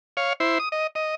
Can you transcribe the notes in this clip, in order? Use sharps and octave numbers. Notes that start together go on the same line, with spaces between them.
C#5 F5
E4 C5
D#6
D#5
D#5